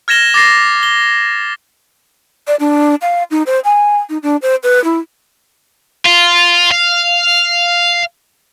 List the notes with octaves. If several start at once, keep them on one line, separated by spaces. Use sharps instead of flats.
F6 G#6 A#6 E7 G7
D6 A6 A#6 C7
G7
D5
D4
F5
D#4
C5
G#5
D#4
D4
C5
B4
E4
F4
F5